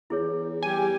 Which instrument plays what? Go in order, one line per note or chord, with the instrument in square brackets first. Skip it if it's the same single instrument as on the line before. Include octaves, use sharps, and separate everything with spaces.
[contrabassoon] E2 [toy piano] E4 G#4 C#5
[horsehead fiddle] G3 G4 [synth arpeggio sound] G#5